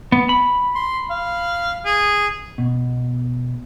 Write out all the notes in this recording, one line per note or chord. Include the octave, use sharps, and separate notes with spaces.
B3
B5
C6
F5
G#4
B2